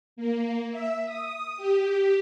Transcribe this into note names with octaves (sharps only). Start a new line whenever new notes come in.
A#3
E5
D#6
G4